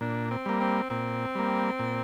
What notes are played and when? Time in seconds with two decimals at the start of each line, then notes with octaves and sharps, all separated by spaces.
0.01 A#2 D4
0.31 C4
0.46 G3 A#3
0.61 C4
0.90 A#2 C4
1.35 G3 A#3
1.79 A#2